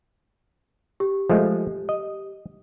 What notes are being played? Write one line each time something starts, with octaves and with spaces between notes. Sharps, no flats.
G4
F3 G#3 A3
D#5